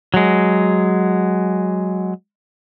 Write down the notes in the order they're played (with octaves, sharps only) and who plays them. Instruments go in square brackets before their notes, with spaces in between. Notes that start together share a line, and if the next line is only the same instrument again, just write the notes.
[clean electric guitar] F#3 G#3